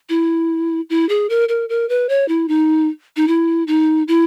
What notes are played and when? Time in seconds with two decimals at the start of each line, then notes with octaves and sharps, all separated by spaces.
0.09 E4
0.90 E4
1.09 G#4
1.30 A#4
1.49 A#4
1.69 A#4
1.89 B4
2.09 C#5
2.28 E4
2.48 D#4
3.16 D#4
3.28 E4
3.67 D#4
4.08 E4